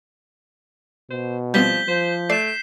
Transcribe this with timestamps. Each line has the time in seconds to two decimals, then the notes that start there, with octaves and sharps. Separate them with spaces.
1.10 B2 C5
1.54 F3 G3 B3 C4 G6 B6 G7
1.88 F3 C5
2.30 A3 D5 C7 E7